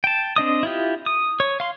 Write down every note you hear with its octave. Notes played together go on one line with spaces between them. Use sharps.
G5 A5
C4 D4 D#5 D#6
E4 F4 G4
D#6
C#5
F5 C6